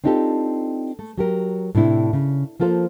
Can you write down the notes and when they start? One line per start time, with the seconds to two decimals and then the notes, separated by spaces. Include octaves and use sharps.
0.04 C4 D4 D#4 F4 G4 A4
0.99 A3
1.18 F#3 G4 A#4
1.75 A2 C3 D4 E4
2.13 C#3
2.60 F3 A#3 F4 A4 C5